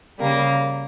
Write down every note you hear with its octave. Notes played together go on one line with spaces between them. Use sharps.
C#3 G3 A#3